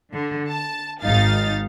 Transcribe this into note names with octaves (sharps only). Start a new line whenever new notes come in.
D3
A5
G#1 G#2 D#4 F5 A6